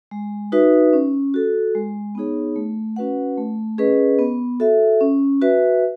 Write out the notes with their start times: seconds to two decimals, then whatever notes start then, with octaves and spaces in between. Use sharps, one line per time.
0.11 G#3
0.52 D#4 F#4 B4 E5
0.93 C#4
1.34 F#4 A4
1.75 G#3
2.15 B3 D#4 G#4 C#5
2.56 A3
2.96 C#4 F#4 B4 F#5
3.37 A3
3.78 C#4 G#4 B4 D#5
4.19 B3
4.60 F#4 A4 E5
5.01 C#4
5.42 F#4 B4 E5